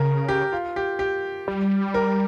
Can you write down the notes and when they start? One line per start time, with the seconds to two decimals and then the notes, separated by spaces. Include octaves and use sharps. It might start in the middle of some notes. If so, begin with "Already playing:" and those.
Already playing: C#3 A#4
0.29 G4
0.53 F4
0.76 G4
0.99 G4
1.48 G3
1.94 A#4